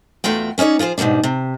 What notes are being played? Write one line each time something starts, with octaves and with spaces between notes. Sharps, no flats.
E2 A3 F4 F#4 G5
B3 C#4 D#4 C#5 D5
F3 F4 G#4 C5
G#2 B2 F3 G3 D4
C3